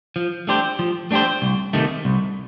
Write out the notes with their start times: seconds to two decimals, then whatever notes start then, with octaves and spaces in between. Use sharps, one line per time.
0.16 F3
0.47 A3 D4 G4 C5
0.79 F3
1.11 A3 D4 G4 C5
1.42 C2
1.73 C3 D#3 A3
2.05 C2